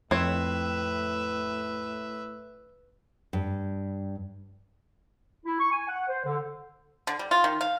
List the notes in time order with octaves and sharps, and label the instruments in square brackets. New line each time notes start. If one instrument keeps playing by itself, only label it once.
[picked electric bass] F2 [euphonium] A2 [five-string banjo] C4 C#5 [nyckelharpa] B4 E5
[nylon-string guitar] G2
[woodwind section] E4
C#6
G#5
F#5
C5
D3
[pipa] D3
G3
F4
D#3
F5